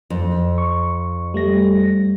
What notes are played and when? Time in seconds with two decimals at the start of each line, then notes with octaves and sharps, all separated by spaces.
0.10 F2
0.58 C#6
1.34 G3 A3 A#6